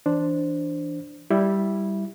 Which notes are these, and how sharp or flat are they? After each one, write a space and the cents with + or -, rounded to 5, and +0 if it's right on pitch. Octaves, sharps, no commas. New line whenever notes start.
E3 +0 D4 +0 C5 +0
G3 +0 E4 +0